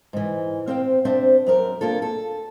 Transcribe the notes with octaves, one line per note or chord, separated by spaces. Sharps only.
G#2 E3
C4 C5 F5 G5
C4 D4 C5 E5
F#2 C4 A#4
A#3 D4 F4 A4
A4